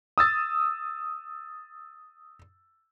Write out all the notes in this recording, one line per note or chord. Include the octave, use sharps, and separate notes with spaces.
D#6 E6 A6